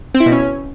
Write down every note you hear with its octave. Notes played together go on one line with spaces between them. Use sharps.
C4
E4
B2
C#4